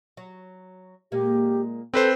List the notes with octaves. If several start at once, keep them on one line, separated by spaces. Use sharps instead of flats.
F#3
A#2 G#3 A#3 G4
C4 A4 B4 C5